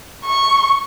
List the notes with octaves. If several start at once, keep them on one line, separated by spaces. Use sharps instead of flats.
C#6